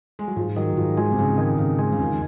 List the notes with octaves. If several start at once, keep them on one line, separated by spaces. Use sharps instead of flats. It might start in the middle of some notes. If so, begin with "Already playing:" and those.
G#3
F#3
G#2 F3
D#3 F#3
G#2 F3
F3 G#3
C3
G#2 C#3
D#3
G#2 C#3
G#3
C#3
F2 D#3